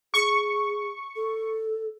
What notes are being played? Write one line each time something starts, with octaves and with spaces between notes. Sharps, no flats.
G#4 C#6
A4